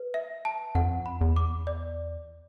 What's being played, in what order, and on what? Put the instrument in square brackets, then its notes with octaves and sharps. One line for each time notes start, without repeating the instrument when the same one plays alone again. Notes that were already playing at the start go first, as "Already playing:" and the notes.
Already playing: [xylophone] B4
E5
A5
[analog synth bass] F2 [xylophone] F#5
[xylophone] B5
[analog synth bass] E2
[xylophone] D6
D5